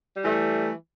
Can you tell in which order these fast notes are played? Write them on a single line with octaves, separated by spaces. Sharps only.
G3 E3 A3